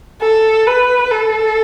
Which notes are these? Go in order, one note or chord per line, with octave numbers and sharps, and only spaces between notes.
A4
B4
A4